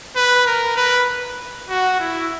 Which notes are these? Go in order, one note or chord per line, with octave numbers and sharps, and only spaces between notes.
B4
A#4
B4
F#4
E4